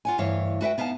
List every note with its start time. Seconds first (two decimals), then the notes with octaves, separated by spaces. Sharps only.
0.05 F4 F#5 G#5
0.18 D2 G2 E3 C#5 F5
0.61 F#4 B4 E5 G5
0.78 B3 D#4 F5 F#5 A5